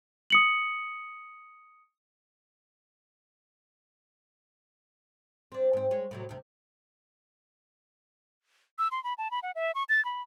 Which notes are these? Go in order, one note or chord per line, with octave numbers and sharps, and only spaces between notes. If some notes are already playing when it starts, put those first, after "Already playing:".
D#6 C#7 F#7
C4 D4
G#2 C4
G#3 C#5
A2 C3 F#3
D2 C3
E6
C6
B5
A5
B5
F#5
E5
C#6
A6
B5